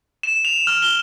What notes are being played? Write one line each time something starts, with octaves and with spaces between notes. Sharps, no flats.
E7
F7
F6
G7